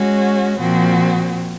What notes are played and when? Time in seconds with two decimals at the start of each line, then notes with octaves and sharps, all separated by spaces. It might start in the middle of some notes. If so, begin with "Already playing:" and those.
Already playing: G#3 C#4 F#4
0.59 A#2 F3 C4 F#4